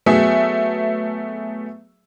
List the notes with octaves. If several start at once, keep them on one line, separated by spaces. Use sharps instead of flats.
F#3 A3 B3 G#4 E5